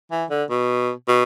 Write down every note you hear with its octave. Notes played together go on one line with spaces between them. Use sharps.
E3
D3
B2
B2